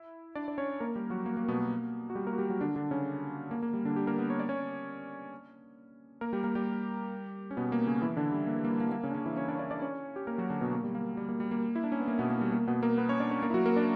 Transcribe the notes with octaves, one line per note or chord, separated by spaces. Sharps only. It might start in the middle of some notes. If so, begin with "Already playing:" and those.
Already playing: E4
D4 D5
D5
C#4 C#5
A#3 A#4
G3 G4
F#3 F#4
A#3
A#3
B2 B3
A#3
F#4
G3 G4
A#3 A#4
F#4
G3 G4
F#3 F#4
D3 D4
D3 D4
C#3 C#4
A#3
A#3
G3
D3 D4
G3 G4
A#3 A#4
B3 B4
C#5
D5
C#4 C#5
A#3 A#4
G3 G4
A#3 A#4
G3 G4
C#4
B2 B3
A#3
C#3 C#4
E3 E4
D3 D4
G3
A#3
G3
A#3
G3
A#3
G3
A#3
C#3 C#4
D4
C#3 C#4
E3 E4
C#4 C#5
D4 D5
C#5
D4 D5
D4 D5
C#4 C#5
G4
A#3 A#4
F#3 F#4
D3 D4
B2 B3
A#3
G3
A#3
G3
A#3
G3
A#3
E4
D4
C#4
B3
A#3
B2 B3
A#3
G3
A#3
B2 B3
A#3 A#4
B3 B4
C#4 C#5
D4 D5
C#4 C#5
A#3 A#4
E4
F#3 F#4
A#3 A#4
D4 D5